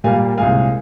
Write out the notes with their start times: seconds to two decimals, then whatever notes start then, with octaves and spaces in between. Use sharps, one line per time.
0.04 A#2 G3 A#3 F5 G#5
0.38 C2 A#2 G#3 F5 G#5